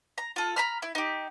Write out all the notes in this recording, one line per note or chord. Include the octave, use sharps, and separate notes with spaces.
A#5
F4 A4
A#5 B5 F6
E4
D#4 G4